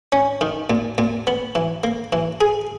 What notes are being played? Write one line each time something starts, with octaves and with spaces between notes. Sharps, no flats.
C#4
D#3
A#2
A#2
B3
E3
A#3
E3
G#4